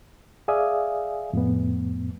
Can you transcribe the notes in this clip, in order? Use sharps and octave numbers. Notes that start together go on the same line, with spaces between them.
G#4 D5 E5 F5 G#5 D#6
F2 A2 B3